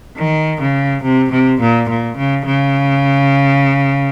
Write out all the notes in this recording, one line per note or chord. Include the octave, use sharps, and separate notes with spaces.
D#3
C#3
C3
C3
A#2
A#2
C#3
C#3